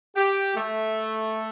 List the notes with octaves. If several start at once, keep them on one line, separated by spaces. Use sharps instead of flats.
G4
A3